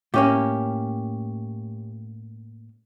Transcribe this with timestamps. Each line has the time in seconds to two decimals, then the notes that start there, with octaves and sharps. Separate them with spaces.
0.14 A2 A#3 C#4 G4